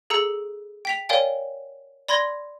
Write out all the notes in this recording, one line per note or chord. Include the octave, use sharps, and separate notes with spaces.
G#4 A4 A#5 E6 C#7
G5 B6 F7
A#4 C#5 D5 F5 G5 G#5
D5 B5 C6 G#6 A#6